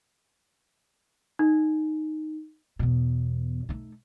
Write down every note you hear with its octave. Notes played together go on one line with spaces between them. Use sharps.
D#4
E2 B2
A3 D#4